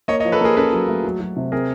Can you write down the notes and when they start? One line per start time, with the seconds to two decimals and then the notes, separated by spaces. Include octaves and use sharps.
0.08 A#3 C#5 D#5
0.20 C#5 D#5
0.25 F3
0.32 A4 B4
0.41 A#3 G#4 A#4
0.57 C#4 A4 B4
0.73 F#3
0.88 A3
1.04 F#3
1.20 F#3
1.36 C3
1.52 C4 G#4 A#4